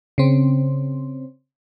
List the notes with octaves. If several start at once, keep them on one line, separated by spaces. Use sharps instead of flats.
C#3 C4